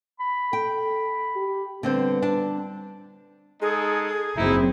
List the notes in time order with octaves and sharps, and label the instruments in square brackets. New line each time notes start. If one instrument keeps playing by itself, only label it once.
[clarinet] B5
[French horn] A4 [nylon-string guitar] G5
[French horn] G4
[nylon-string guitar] D3 C4 C5 [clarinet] G3 [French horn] B3
[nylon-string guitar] D4 A5
[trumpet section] G#3 D#4 A4 [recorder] G#4
[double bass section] F#1 F#2 C4 [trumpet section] D#4 E4